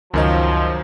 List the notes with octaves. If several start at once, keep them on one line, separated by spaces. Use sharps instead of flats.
C#2 F#2 D#3 F3 F#3 D#5